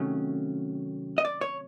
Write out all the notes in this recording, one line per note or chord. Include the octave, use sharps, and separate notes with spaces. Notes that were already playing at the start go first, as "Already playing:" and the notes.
Already playing: C3 D#3 F#3 A3 C#4
D#5
D5
C#5